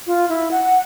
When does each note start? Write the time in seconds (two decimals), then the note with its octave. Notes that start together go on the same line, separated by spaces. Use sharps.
0.07 F4
0.29 E4
0.51 F#5